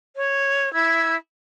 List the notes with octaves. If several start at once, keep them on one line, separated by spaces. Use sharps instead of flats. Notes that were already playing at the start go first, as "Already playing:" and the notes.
C#5
E4 E6 G#6